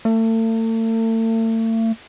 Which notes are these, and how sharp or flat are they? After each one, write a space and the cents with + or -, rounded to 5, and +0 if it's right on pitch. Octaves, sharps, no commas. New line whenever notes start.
A3 +40